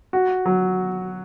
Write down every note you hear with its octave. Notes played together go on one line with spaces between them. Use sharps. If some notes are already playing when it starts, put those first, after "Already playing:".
F#4
F#3